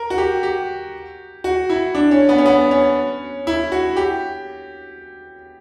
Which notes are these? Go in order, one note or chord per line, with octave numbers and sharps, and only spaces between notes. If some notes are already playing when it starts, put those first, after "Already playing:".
Already playing: A#4
F#4
G4
G4
F#4
E4
D4
C#4
B3
C#4
B3
C#4
E4
F#4
G4